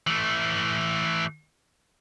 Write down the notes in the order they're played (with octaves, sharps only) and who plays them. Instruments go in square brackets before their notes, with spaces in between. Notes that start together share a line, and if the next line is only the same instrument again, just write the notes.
[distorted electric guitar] E3 A3